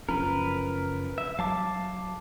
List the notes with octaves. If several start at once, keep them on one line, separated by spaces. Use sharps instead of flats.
F#1 F3 C#4 A#4 B4
E5
F#3 F5 A5 D6